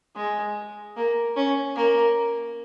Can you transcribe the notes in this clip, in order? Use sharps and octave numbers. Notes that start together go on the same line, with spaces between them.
G#3
A#3
C#4
A#3